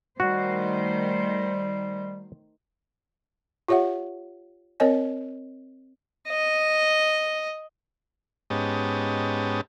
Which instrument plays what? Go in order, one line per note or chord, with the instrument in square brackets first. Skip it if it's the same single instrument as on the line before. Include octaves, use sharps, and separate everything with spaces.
[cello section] D#3 A3 C5 [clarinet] G3 [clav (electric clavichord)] F#4
[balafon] F4 G4 C#5 E5 F#5
C4 A#4 C#5 D#5 G#5
[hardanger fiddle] D#5
[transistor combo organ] G#2 B3 C#4 G4 D#5 A5